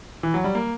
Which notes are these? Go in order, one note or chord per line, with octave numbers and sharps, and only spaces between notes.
E3
F#3
G3
A#3